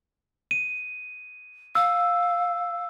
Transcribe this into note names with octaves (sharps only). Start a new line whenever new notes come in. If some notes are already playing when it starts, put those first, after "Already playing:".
D#7
F5 E6